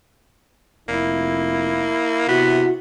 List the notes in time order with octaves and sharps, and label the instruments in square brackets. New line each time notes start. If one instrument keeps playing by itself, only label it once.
[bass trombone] F1 [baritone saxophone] A#3 [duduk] E4
[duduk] C3 [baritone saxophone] B3 [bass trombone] E4 [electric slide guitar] F#4